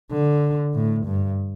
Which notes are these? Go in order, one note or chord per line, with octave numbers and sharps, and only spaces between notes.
D3
A2
G2